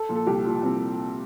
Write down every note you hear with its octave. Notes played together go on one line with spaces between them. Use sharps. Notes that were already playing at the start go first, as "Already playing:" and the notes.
Already playing: A4
A#2 F3
A4
C2 G4
A#2 F3
C2 C4